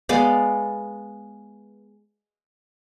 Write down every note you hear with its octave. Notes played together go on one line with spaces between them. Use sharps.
G#3 B3 D5 F5